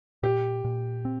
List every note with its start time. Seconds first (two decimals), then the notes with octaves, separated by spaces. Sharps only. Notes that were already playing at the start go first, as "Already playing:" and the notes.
0.23 A#2 G4
0.64 A#2
1.05 C4